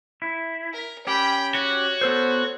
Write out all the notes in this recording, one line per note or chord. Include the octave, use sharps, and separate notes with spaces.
E4
A#4
C#4 G4 G5 B5
F#4 C#5
B3 A4 C5